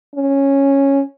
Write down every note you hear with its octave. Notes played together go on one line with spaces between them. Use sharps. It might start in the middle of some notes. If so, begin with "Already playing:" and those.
C#4